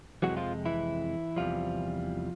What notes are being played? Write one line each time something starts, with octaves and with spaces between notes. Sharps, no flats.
F2 C3 E3 F#3 G#3 F#4
F3 F4
E3 E4
E2 C3 E3 F3 G3 F4